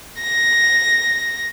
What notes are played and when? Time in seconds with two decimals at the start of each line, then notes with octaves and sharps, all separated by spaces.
0.22 A#6